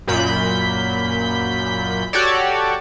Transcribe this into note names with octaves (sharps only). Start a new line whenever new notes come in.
F#2 A#2 B5 G6 B6
F#4 G4 A4 C#5 D5